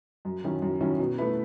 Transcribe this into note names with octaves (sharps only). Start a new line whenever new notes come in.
F#2
D#3 F#3 C#4 E4
F#2
D#3 F#3 C#4 E4
B2
A3 E4 B4